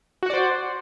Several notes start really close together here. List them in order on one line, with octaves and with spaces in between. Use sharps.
F#4 F#5 D5 C5